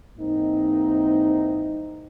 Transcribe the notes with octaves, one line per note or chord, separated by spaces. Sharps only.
G#2 E3 A#3 C4 D#4